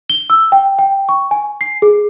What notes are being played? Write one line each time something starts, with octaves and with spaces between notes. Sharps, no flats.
G7
E6
G5
G5
C#6
G#5
C7
G#4